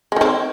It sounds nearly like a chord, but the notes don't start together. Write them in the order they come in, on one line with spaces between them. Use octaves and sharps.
G#3 D#3 C4